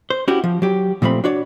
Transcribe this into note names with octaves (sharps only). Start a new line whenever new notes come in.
C5
C#4 E4 F#4 G4
F3
F#3 G4
A#2 F3 A3 C4 B5
D4 F#4 C#5 D5